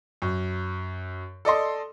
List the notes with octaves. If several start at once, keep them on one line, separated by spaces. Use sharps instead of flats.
F#2
A4 D5 D#5 C6